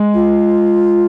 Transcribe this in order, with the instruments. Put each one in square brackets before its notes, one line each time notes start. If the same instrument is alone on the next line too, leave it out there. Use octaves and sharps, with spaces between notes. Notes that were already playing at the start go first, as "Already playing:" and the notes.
Already playing: [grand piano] G#3
[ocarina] F4